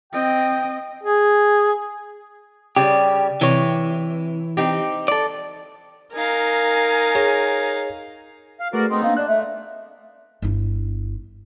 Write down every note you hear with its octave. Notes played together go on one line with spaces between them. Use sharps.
C4 D#5 G5
G#4
C#3 G3 G4
C3 E3 C#5
C4 D#4 G4
A4 D5
D#4 A#4 F5 G#5
G#4 C#5
F5
A3 F#4 G#4 A#4 B4 D5
B3 C4 D#4 C6
A#3 D4 F5
D4 D5 D#5 F#6
A3 E5
G1 E4